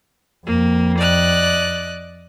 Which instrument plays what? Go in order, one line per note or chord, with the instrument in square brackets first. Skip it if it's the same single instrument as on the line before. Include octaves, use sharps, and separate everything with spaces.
[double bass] F2 [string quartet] A#3
[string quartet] D5 D#5 F#6